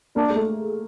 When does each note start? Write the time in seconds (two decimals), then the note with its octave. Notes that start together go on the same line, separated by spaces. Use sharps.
0.16 A#3 D4
0.30 G#3
0.36 A3